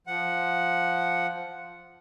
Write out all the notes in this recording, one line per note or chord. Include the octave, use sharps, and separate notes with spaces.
F3 F#5